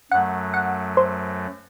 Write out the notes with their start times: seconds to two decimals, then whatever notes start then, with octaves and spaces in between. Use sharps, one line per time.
0.11 F#2 F#3 A3 F#5
0.54 F#5
0.97 C5